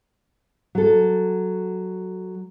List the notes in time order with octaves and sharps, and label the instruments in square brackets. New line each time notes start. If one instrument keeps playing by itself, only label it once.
[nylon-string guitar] F#3 A4